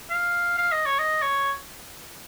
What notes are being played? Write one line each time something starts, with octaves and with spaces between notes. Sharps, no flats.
F5
F5
D#5
C#5
D#5
C#5